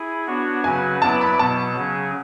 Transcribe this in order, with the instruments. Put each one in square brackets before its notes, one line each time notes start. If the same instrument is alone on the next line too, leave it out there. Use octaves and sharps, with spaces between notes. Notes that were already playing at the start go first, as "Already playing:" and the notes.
Already playing: [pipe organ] E4 G#4
B3 D4 F#4 C#5
[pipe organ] C#3 F#3 C#4 F#4 B4 [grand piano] G#5
[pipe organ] F#3 B3 E4 B4 D5 [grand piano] A5
[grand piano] B5
[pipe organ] B2 F#3 B3 [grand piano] A5
[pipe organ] C#3 F#3 C#4 G#4